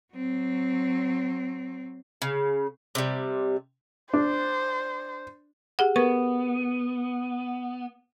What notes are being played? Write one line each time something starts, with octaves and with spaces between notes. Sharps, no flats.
F#3 C4
C#3
C3 G3
D4 C5
G4 G#4 F#5
B3 A#4 B4 C#6